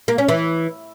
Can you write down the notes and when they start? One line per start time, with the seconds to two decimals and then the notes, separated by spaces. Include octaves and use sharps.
0.08 A#3
0.18 C#4
0.28 E3